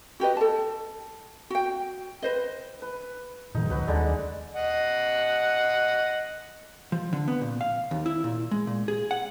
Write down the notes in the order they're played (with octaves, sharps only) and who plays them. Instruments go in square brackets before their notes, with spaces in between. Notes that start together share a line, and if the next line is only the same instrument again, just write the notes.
[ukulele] F#4 G4 B4 D#5
A4 A5
F#4 G5
B4 C5 D#5
[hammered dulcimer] B4
[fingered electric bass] A#2 D#3 F#3 [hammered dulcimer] D#4
[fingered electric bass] C#2 [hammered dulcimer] F#3 B4
[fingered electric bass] D#2 [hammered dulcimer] D3 G3 G#3
[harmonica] D#5 F#5
[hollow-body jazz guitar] F3
D3
B3
A#2
F5
D#2
E4
A#2
G#3
A#2
G#4
F#5